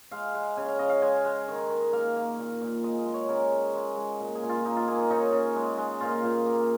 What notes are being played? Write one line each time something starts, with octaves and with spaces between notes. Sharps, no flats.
G#3 F5
G#3
C#3 G#5
F5
C#3 D#5
F5
G#3 G#5
G#3
D#3
D#3
A#3 F5
A#3
A#2
A#2
G#3 D#5
D#5
G#3
C#5
C#3 A#4
C#3
G#3
G#3
A#2
G#4
A#2
F4
A#3 D#4
F4
A#3 G#4
D#4
C#3 D#4
C#3
G#3
G#3
A#2 F4
A#2
A#3